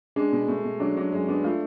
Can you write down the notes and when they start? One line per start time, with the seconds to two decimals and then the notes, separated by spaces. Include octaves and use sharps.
0.16 G#3 D4
0.32 B2
0.48 B2 A3
0.64 B2
0.80 F#3 D4
0.97 F#3 D4
1.12 F#2 G#3
1.28 B3 D4
1.44 A3 F4